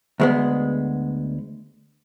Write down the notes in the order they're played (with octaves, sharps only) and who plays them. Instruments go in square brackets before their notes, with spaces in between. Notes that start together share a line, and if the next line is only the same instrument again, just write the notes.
[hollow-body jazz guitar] D2 G#3 B3